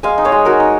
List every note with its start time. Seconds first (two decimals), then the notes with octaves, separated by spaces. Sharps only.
0.03 G#3 F5 G#5
0.18 D#4
0.25 C#5 F5
0.32 G#3
0.45 D#4 F#4 A#4
0.60 D#4